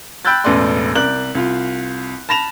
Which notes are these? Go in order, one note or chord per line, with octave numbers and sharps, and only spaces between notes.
G5 B5 E6 F#6 G6 A6
E1 A1 A4 B4 D5 C6
C2 A#4 D5 F#6 F#7
C2 F4
A5 B5 A#6 E7 F7